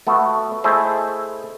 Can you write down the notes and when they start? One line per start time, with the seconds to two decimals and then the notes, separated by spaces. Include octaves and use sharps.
0.07 A3 B3 F#4
0.64 A3 E4 G#4 C5 D#5